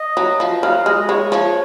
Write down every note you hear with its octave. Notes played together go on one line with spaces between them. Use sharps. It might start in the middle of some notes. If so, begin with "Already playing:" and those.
Already playing: D#5
F#3
F3
F#3 F5
G#3 D#5
G#3 C#5
F3